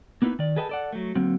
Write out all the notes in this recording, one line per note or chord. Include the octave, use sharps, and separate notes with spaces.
A#3 B3 D#4 E4 B4
D#3 D5
G#4 A4 B4 D#5 G5 A5
A4 D5 F#5
F#3 A3
D3 F#3 A#3 C4